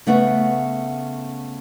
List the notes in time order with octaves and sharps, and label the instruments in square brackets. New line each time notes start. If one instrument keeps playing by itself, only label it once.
[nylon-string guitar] C#3 A3 B3 F#5